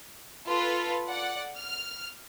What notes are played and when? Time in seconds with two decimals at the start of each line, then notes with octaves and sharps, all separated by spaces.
0.46 F4 A4 B4
1.08 D5 F#5
1.56 F6